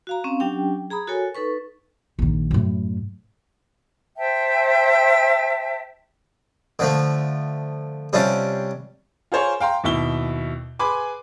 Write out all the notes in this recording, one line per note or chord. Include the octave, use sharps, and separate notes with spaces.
F#4 F5 A#5
C4 C#4 F5
F#3 C#4 D4 G4 G5
G#4 A#5 B5 D#6
F#4 A4 A#4 C#5 G#5
D#4 A4 B4 C#6
A#1 D#3
F#2 A2
C5 E5 G5 A5
D3 F3 A3
C3 G3 C#4 D4 F4
F4 G#4 A#4 C5 C#5
F5 G5 A#5 C6
D#2 B2 E4 E5 G7
G#4 B4 G#5 B5 C6 D6